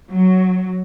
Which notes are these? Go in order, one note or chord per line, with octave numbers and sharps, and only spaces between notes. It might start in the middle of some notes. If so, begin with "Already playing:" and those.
F#3